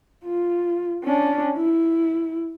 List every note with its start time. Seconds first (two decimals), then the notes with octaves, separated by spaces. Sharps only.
0.24 F4
1.04 C#4 D4
1.56 E4